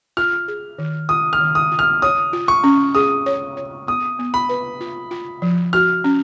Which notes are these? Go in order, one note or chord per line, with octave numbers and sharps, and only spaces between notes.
F4 F6
G#4
D#3
F4 D#6
F6
D#3
D#6
F4
F6
C#5 D#6
F4
C#6
C#4
G#4 D#6
C#5
C#5
B3 D#6
B3
B5
B4
F4
F4
F3
F#4 F6
C#4